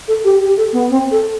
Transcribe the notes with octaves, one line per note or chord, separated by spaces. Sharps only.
A4
G4
G4
A4
B3
C4
A4